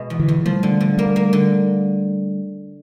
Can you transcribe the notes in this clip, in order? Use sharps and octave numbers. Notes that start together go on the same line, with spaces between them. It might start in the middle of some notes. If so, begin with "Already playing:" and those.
Already playing: B2 G#3
E2
D3 E3
E2
F3 G3 A3
D3
D3
G3 A3 A#3
A#3
D3